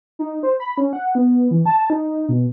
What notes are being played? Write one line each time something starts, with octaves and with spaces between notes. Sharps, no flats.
D#4
C5
B5
C#4
F#5
B3
E3
A5
D#4
B2